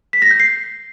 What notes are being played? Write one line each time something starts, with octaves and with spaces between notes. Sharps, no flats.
B6
A#6
G6
C7